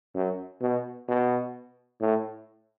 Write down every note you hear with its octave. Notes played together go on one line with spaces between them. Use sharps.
F#2
B2
B2
A2